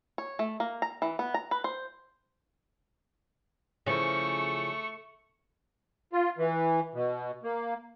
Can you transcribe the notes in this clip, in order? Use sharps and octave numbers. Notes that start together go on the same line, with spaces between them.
C#5
A3
A#3
A#5
E3
B3
A#5
B4
C5
C#3 E3 F3 A3 C#6
F4
E3
B2
A#3